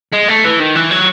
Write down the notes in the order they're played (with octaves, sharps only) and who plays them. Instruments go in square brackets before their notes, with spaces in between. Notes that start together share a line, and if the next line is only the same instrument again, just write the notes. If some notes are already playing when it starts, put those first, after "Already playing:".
[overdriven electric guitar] G#3
A3
E3
D#3
E3
F#3